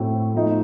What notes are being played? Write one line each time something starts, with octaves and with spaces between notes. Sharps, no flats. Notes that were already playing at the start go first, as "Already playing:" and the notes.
Already playing: A2 A3 C4 F#4
F3 A3 D#4